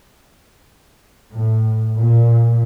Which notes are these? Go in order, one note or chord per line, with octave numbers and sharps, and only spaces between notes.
A2
A#2